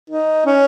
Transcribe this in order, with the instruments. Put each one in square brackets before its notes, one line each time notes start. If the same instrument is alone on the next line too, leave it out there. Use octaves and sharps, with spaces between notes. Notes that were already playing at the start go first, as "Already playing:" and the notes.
[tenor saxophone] D#4
C#4